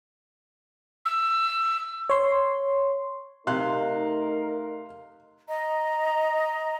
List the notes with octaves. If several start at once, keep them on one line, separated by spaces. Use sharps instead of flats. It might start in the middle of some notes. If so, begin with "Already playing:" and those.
E6
C#5 C6
C3 A3 D#4 A#4 D#5 F5 C6 F#6
D#5 A#5